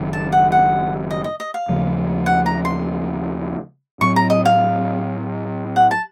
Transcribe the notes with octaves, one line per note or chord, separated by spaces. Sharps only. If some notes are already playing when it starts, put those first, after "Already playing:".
Already playing: F#1 F#2 D#3
A5
F#5
F#5
D#5
D#5
D#5
F5
D#2 C#3 F3 A3
F#5
A#5
C6
A2 F#3 C4 C#6
A#5
D#5
F5
F#5
A5